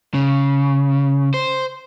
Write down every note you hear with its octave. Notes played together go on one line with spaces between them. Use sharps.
C#3
C5